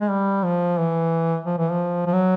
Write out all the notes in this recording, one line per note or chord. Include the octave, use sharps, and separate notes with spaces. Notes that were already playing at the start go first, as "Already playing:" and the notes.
G#3
G3
F3
E3
F3
E3
F3
F3
F#3